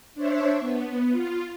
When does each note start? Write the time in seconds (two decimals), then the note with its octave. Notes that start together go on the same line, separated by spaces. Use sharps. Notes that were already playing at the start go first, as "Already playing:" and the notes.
0.15 D4 C5 C#5 E5
0.60 B3
1.12 F4